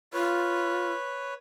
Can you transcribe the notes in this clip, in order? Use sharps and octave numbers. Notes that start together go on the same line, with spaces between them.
F4 B4 C#5